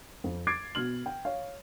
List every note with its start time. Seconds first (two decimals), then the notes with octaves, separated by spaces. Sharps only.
0.24 F2
0.47 D6 G#6 A6 C7 D7
0.75 B2 F6 F#7
1.06 G5
1.25 C#5 F5